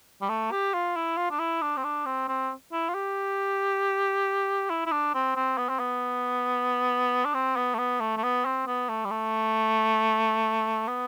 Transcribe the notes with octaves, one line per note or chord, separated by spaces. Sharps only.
G3
A3
G4
F4
E4
F4
D4
E4
D4
C4
D4
C4
C4
E4
F4
G4
E4
E4
D4
C4
C4
B3
C4
B3
D4
C4
B3
A3
B3
A3
A3
B3
C4
B3
A3
G3
A3
B3